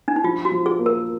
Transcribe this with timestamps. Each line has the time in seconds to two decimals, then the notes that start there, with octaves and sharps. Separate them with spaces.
0.08 D4
0.16 D#4
0.24 F3 F4
0.45 F#4
0.52 F3
0.66 G#4
0.79 A#3
0.86 A#4